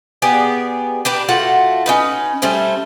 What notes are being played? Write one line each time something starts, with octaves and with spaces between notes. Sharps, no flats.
B3 G4 G#4 D5
D4 G4 B4
A3 F4 F#4 F#5
C#4 D#4 B4
G3 A3 C#4 C5